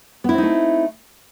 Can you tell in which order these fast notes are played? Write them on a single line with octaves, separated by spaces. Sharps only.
B3 E4 C4 D#4 A3